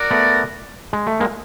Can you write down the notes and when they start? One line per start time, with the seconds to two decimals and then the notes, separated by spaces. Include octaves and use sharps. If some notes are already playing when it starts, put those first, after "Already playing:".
Already playing: F#4 A#4 D5
0.11 A3 B3
0.93 G#3
1.07 A3
1.20 G#3 A#3